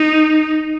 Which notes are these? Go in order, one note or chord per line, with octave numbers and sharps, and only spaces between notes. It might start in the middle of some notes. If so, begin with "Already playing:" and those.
Already playing: D#4